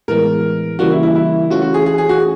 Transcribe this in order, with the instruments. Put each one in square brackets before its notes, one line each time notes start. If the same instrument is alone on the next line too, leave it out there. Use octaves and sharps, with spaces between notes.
[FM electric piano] A2 E3 G#3 B3 [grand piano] A#4
[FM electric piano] C#3 E3 G3 A#3 [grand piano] F#4
[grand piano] E4
E4
E4
[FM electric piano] E3 A3 C#4 F4 [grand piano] F#4
[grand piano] F#4
G#4
G#4
G#4
F#4